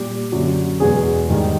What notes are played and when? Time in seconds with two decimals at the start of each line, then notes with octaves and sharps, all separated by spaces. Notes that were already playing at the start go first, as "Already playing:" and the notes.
Already playing: A#2 G3 G4
0.32 F#2 D3 F#3
0.80 E2 B2 G#3 G#4
1.29 G#2 D#3 G3